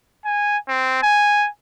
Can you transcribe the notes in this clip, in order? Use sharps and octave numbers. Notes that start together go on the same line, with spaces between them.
G#5
C4
G#5